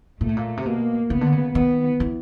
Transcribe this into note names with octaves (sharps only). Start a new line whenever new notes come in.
A#2 A3
A2
A#2
C3
B2 A#3
C#3 B3
D3
C#3
D#3 B3
E3